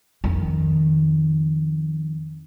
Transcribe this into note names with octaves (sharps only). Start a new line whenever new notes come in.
F2 D#3